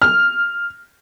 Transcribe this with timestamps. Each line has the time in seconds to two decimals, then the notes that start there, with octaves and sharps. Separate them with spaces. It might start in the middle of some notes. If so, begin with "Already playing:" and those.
0.02 F6